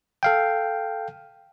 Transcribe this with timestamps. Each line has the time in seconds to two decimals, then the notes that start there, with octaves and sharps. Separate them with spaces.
0.23 A4 F5 G5